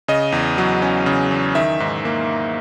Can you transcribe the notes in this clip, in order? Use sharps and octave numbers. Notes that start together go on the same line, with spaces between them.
C#3 D#5
E2
F#3
C#4
C#3
E2
D#3 E5
G#2
A#3